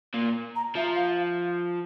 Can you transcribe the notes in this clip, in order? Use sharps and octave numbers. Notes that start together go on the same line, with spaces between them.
A#2
A#5
F3 E5
F5